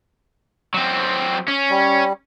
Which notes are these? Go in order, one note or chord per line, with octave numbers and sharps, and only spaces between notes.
F#3 C4
C#4
G3